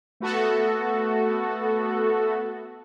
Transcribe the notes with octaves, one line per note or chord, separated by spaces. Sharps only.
A3 B3 F#4 A4